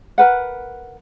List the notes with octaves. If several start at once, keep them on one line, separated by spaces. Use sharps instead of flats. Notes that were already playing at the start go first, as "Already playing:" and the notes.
A#4 B4 F#5